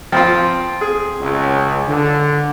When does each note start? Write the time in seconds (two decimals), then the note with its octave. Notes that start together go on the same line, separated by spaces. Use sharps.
0.12 F3 C4 F4 G5 C6
0.81 G#4
1.20 C#2
1.89 D3